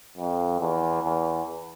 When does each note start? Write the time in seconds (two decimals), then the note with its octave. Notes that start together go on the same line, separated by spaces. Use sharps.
0.17 F2
0.60 E2
1.03 E2